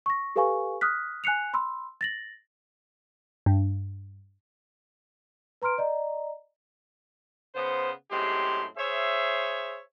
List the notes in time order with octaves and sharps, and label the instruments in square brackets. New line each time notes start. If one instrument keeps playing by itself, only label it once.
[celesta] C#6 A#6
G4 A4 B4 F5 G#5 C#6
D#6 F6 F#6 B6
G#5 F#6 C7 C#7 F7
B5 C6 E6
A6 A#6 F#7
[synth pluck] G2
[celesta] B4 A#5 C6 F6 D7
D5 D#5 A#5
[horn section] C#3 B3 C5
F#2 A2 G#3 C4 G4 C6
G#4 C5 C#5 E5